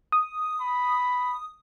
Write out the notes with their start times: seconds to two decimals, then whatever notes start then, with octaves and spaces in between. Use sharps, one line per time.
0.12 D#6
0.62 B5